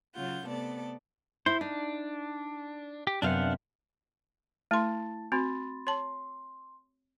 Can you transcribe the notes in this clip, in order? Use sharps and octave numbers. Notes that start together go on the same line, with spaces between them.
C#3 F#3 F4 F#5 G6
C3 A3 B3 A4 D5
E4 C5
D4 D#4
G4
F#2 C3 B3 D4 F5 F#5
A3 E4 A#4 A5 C6 A6
C4 F#4 B5 C6 A6
C#5 A5 C6